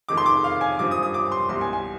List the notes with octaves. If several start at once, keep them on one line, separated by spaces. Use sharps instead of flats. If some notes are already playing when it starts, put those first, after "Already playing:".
F2 D#3 G#3 D6
C6
D6
F5
G#5
G2 F3 C4 D6
D#6
D#6
D6
C6
C2 B2 G3 C6
G#5
G#5